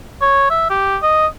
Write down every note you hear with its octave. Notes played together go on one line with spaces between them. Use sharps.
C#5
E5
G4
D#5